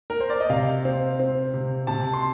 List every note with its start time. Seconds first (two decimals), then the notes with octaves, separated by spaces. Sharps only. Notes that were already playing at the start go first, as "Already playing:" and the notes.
0.10 A#4
0.20 C5
0.30 D5
0.40 D#5
0.49 C3 F5
0.85 C4
1.19 C4
1.54 C3
1.87 C3 A5
2.14 C6